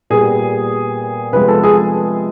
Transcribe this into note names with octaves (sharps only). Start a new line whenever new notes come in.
A#2 G3 B3 G#4
C3 F3 G#3 B3 B4
A4
G#4